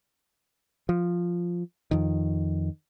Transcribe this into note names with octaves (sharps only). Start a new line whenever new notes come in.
F3
F2 D#3